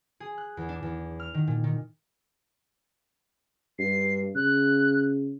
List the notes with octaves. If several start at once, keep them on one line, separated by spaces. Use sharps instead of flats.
G#4
F#6
E2
D4
E2
F6
D#3
A#2
D#3
G2 C7
C#3 F#6